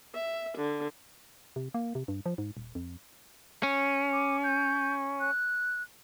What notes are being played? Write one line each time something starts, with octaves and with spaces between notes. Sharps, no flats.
E5
D3
C3
A#3
C3
G2
F3
G#2
D#1
F2
C#4
D6
G6
F#6